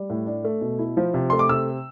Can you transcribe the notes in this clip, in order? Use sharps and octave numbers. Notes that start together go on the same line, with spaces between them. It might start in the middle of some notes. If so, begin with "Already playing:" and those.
Already playing: G3
A2
D4
A3
B2
E4
F3
C3
A3 C6
D6
C3 E6